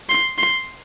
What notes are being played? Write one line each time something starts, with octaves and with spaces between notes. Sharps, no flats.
C6
C6